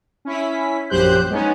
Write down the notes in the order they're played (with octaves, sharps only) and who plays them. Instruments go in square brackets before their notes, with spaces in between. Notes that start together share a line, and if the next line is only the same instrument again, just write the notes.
[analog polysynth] C#4 E4 B6
A#1 F#2 G4 C5 F#6 G6
G#3 B3 C#4 D#4